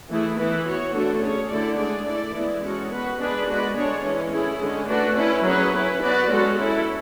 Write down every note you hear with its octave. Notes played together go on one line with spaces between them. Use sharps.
E3 A3 E4 G#4
E3 B3 E4 B4
B3 F#4 C#5
D3 A3 D4 F#4 A4
C#4 G#4 C#5
D3 A3 E4 A4 D5
G#3 D4 G#4 D5
A3 E4 A4 D5
E3 G#3 B3 E4
G#3 C#4 F#4 A4
B3 F#4 B4
G#3 B3 D4 G#4 B4
G#3 B3 F#4 B4 D5
D3 G#3 D4 G#4 C#5
E3 G#3 C#4
A3 C#4 E4 G#4
D3 G#3 C#4
A3 D4 F#4 B4
C#4 E4 B4
F#3 C#4 G#4 B4
C#4 E4 B4
B3 F#4 B4 D5
G#3 C#4 F#4 A4
C#4 E4 A4